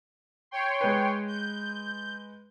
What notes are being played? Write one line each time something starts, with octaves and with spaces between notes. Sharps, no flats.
C#5 G5 C6
G#3 B4
G6